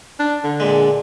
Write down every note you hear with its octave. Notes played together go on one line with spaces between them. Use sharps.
D4
D3
A#2 G#3